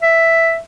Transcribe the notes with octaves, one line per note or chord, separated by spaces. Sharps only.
E5